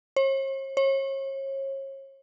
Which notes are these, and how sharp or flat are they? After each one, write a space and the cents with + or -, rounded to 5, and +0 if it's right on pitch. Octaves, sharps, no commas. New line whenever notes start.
C#5 -45
C#5 -35